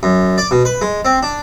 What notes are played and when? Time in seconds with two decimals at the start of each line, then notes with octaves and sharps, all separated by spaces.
0.03 F#2
0.38 D5
0.51 B2
0.65 B4
0.82 G#3
1.05 C4
1.23 D4